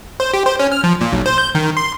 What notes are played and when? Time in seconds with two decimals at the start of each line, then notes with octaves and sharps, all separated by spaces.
0.20 C5
0.34 G4
0.46 C5
0.59 C#4
0.72 F6
0.84 F3
1.01 A#2
1.12 B1
1.26 C5
1.38 G6
1.55 D#3
1.77 C6